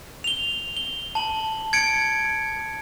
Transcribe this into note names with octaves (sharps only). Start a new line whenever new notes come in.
F7 G7
G7
A5 F#7
G#6 C#7 D7